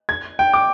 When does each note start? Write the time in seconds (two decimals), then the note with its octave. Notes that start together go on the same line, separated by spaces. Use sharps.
0.09 G#6
0.39 G5
0.54 D6